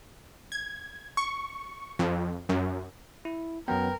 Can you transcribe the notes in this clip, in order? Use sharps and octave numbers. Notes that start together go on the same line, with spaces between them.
G#6
C#6
F2
F#2
E4
F#2 F#3 B3 A#4 B4 G5